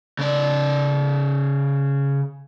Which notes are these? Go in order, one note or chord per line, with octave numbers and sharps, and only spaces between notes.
C#3 D5